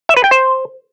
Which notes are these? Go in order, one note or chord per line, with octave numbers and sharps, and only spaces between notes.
E5
B4
G5
C5